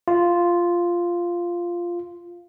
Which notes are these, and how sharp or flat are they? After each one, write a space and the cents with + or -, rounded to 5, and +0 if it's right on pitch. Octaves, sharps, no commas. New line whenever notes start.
F4 -5